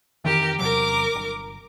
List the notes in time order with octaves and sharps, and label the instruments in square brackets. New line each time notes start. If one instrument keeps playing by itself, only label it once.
[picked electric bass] F2 D#3 E3 [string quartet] G4 A#4
[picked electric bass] E2 C3 F#3 [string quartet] A#4 D6
[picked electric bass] G1